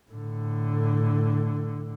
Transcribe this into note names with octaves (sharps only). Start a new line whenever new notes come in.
A2 D3